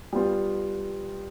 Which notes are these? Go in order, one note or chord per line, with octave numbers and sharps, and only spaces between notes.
G3 B3 F4